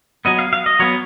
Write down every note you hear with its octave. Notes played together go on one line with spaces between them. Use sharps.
F#3 B3 D#5
F5
F5
D#5
F#3 B3 C#5